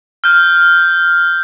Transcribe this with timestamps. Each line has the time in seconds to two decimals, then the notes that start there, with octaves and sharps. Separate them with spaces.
0.24 F6 G6